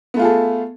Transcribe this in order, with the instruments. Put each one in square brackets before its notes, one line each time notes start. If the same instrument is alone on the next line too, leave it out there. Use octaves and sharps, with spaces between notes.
[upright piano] B3
A3
F4
G#4
A4